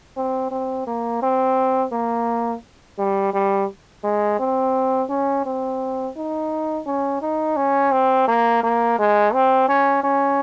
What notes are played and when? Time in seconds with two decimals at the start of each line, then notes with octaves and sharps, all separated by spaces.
0.17 C4
0.51 C4
0.87 A#3
1.22 C4
1.92 A#3
2.98 G3
3.33 G3
4.04 G#3
4.40 C4
5.10 C#4
5.46 C4
6.17 D#4
6.86 C#4
7.22 D#4
7.57 C#4
7.92 C4
8.28 A#3
8.63 A#3
8.99 G#3
9.34 C4
9.69 C#4
10.04 C#4